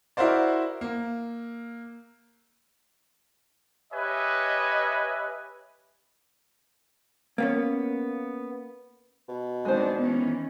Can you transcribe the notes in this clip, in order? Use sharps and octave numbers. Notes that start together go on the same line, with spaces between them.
E4 F#4 A#4 C5 D5
A#3
G4 B4 C#5 D#5 E5 G#5
A#3 B3 C#4
B2
D#3 G#3 C4 D4 C5
D#3 E3 B3 C#4